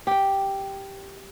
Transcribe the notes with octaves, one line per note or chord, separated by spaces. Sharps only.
G4 G5